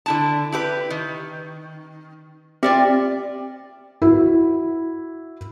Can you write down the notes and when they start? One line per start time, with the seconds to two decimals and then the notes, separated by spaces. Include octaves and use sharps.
0.06 D3 E4 A5
0.52 E4 G4 B4
0.90 D#3
2.63 C4 F4 G4 D5 E5
4.02 E4 F#4